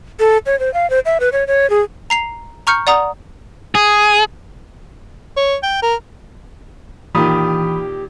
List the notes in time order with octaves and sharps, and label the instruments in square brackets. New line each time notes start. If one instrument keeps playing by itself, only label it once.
[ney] A4
C#5
C5
F5
C5
E5
B4
C#5
C#5
G#4
[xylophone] A#5 C7 F7
A#5 C#6 F6 G6 C#7
D5 F#5 A#5 D#6
[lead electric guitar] G#4
[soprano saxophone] C#5
G5
A#4
[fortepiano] A#2 D#3 [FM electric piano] E3 [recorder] G4 [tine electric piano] B5 D#6